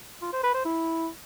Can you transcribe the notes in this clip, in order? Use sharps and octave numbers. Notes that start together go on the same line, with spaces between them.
F4
C5
B4
C5
E4